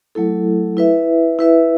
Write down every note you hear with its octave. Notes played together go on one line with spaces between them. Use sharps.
F#3 A3 E4 A4
E4 B4 E5
E4 B4 E5